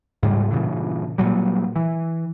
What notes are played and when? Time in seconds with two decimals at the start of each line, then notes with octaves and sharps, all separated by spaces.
0.23 G#2 C#3 G3 G#3
0.52 G2 A#2 C#3 E3
1.18 A#2 F#3 G3
1.76 E3